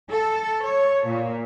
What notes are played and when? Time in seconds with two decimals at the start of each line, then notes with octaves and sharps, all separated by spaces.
0.11 A4
0.64 C#5
1.07 A#2